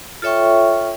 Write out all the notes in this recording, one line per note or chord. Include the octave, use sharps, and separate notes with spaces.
F4 A4 C#5 E5 G5 C#6